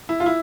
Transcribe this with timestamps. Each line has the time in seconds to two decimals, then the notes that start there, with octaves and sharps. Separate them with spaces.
0.09 E4
0.20 F4
0.26 E4